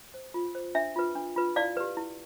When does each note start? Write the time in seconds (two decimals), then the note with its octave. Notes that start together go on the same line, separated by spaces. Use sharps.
0.14 C5
0.34 F4
0.55 C5
0.75 D4 E5
0.96 F4 B4
1.15 D4
1.36 F4 B4
1.56 E4 D5 F5
1.77 G4 B4
1.97 E4